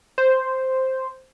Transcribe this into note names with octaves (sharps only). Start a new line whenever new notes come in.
C5